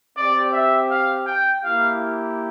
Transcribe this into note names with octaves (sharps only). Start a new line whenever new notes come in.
C4 G4 D5
E5
F5
G5
A#3 E4 G4 F5